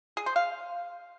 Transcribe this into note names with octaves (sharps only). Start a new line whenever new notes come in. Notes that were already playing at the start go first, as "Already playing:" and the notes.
G#4
C5
F5